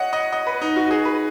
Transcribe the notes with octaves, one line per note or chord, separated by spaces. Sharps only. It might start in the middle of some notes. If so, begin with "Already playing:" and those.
Already playing: C#5 D#5 F#5
D#5
D#5
B4
D#4
F#4
G#4
B4